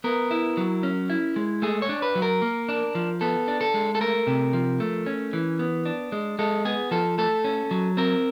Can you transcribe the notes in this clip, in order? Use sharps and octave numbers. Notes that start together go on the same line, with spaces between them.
B3 A#4
E4
F#3
C#4
E4
G#3
A3 G#4
C#5
D4
B4
F#3
A#4
A#3
D4
F3
B3 A4
D4
A4
G#3
A4
A3 A#4
C3
F3
A3
C#4
E3
B3
D4
G#3
G#3 A4
B3 G#4
F3 A4
A3 A4
C#4
F#3
C4 A#4